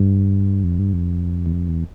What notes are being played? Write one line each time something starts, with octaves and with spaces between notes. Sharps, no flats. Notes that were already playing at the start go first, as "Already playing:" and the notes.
Already playing: G2
F2
G2
F2
E2
F2
E2